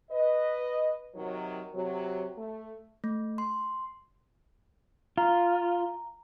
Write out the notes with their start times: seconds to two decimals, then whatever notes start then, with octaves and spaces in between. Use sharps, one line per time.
0.11 B4 D#5
1.15 C3 D#3 F#3
1.74 C3 F#3
2.37 A3
3.04 A3
3.38 C6
5.17 F4 A#5